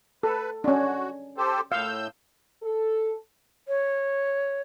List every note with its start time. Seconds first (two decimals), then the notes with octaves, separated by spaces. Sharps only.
0.23 A4 B4
0.64 C#4 D4 F#4
1.37 G4 A4 C5
1.72 A2 F5 E6 G6
2.63 A4
3.68 C#5